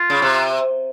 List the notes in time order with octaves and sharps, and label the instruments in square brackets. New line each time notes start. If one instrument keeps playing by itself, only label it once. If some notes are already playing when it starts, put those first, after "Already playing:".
Already playing: [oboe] F4
[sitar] C#3
C3